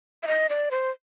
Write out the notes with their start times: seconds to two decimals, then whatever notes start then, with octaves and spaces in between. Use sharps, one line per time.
0.23 E5
0.27 D#5
0.50 D5
0.71 C5